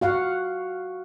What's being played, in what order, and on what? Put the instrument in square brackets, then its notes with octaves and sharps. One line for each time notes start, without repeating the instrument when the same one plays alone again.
[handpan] F#4 F5 F#5